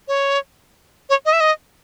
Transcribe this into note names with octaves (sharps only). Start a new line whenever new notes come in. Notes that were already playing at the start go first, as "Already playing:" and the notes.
C#5
C#5
D#5
E5
D#5